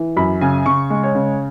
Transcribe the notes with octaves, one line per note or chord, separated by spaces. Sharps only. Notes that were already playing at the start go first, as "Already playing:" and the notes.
Already playing: E3
F#2 B5
C#3 G#5
C#3 C#6
G#3
C#5
C#3